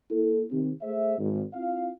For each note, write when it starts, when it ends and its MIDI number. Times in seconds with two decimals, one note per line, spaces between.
0.11 0.42 58
0.11 0.42 64
0.11 0.42 69
0.50 0.71 48
0.50 0.71 51
0.50 0.71 60
0.82 1.16 57
0.82 1.16 68
0.82 1.16 72
0.82 1.16 76
1.18 1.42 32
1.54 1.89 60
1.54 1.89 64
1.54 1.89 65
1.54 1.89 77